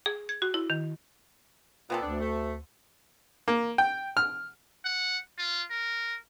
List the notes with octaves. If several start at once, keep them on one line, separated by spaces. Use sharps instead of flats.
G#4
G#6
F#4
E4
D#3
A#2 B3 C4 A4
D2 D4
A3
A#3
G5
F6
F#5
F4
A#4